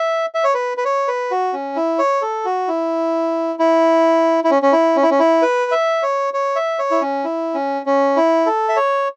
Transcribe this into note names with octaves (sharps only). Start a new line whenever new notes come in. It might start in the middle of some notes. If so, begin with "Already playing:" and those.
Already playing: E5
E5
C#5
B4
B4
C#5
B4
F#4
C#4
E4
C#5
A4
F#4
E4
E4
E4
C#4
C#4
E4
C#4
E4
C#4
E4
B4
E5
C#5
C#5
E5
C#5
E4
C#4
E4
C#4
C#4
E4
A4
E5
C#5